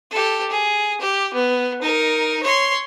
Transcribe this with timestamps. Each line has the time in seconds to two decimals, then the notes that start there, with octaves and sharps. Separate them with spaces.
0.11 G4 A4
0.50 G#4
1.01 G4
1.34 B3
1.82 D#4 A#4
2.43 C#5 C6